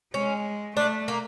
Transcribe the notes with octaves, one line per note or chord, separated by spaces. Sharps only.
G#3 C#4
A3 D4
A#3